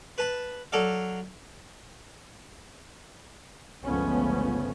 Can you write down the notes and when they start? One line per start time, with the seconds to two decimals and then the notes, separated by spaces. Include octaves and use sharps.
0.18 B4 A5 B5
0.72 F#3 A4 D5 F5
3.84 G1 C#2 F3 A3 B3 C#4